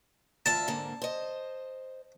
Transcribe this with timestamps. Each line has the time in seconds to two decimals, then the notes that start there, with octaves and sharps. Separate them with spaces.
0.46 D2 F4 E5 A5
0.68 G#2 D3 A#3
1.02 C5 D#5